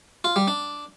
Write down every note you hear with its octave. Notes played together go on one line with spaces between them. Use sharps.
F4
G3
D4